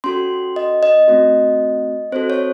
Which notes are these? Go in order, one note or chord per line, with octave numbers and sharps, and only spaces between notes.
C#4 F#4 A4 C6
D#5
D#5
A3 C4 F#4
C4 F#4 A4 C5
C#5